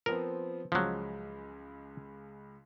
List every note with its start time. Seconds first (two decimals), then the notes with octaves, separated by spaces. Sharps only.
0.06 F3 B3 C4 A#4
0.72 C#2 F3 F#3 G#3